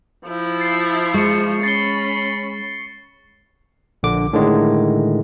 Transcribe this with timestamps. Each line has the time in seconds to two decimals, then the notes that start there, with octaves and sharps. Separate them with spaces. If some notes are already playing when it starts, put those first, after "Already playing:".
0.25 F3 E4
0.60 A6 C7
1.14 G#3 C#6 C#7
1.63 C#4 B5 A6 C7 G7
4.03 A#1 D3 D6
4.33 A2 D3 D#3 G#3